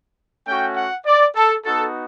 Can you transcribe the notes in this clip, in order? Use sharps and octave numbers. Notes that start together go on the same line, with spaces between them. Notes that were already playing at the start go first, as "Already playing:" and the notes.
A3 C#4 F#4 G5
F#5
D5
A4
B3 D#4 F#4 A4